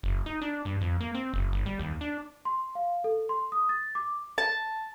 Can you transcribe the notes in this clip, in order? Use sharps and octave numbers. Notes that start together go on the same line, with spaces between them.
F#1
D#4
D4
G2
F2
A#3
C4
F#1
G1
G3
D#2
D4
C6
F5
A4
C6
D#6
A6
D6
A5